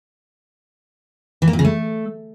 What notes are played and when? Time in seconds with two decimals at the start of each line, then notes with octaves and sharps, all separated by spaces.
1.42 E3
1.48 A#3
1.53 A#2
1.59 C#3
1.65 A3